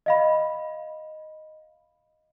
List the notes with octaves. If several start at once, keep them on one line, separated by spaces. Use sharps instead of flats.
D#5 F5 B5